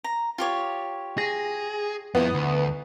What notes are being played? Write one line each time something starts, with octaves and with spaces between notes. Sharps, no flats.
A#5
F4 G4 C#5
G#4 A#6
F2 B3 E4
D2